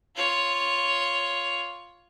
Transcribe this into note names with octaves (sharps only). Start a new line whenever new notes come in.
F4 C#5